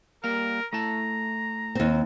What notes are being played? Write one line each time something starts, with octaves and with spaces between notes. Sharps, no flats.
G3 A#3 A#4 F5
A3 E4 A5 A#5
D#2 C4